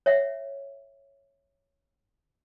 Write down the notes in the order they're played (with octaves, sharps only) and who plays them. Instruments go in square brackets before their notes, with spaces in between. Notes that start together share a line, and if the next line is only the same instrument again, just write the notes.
[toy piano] C#5 E5 F#5